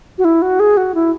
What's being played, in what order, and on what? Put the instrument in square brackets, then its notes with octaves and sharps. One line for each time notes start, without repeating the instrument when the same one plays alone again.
[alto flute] F#4
E4
F#4
G#4
F#4
E4